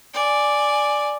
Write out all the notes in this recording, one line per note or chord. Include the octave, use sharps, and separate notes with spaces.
D5 G#5